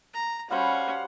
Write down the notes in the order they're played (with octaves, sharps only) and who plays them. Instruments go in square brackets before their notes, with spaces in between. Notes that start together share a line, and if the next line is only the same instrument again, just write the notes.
[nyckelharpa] A#5
[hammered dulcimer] G3 F#4 C5 [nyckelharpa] C#4 [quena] F5 [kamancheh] F#5